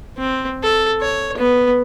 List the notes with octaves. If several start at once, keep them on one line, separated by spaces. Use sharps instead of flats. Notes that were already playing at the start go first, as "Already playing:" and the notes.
C4
A4
C#5
B3